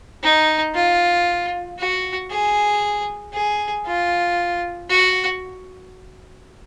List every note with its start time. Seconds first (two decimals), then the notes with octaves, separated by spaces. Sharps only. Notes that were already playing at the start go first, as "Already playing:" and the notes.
0.23 D#4
0.75 F4
1.78 F#4
2.30 G#4
3.33 G#4
3.86 F4
4.89 F#4